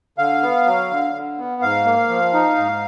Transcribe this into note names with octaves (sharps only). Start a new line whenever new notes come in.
D3 F5
B3
F#3
D3
D3
B3
G#2 F5
A#3
F3
D#4
G#2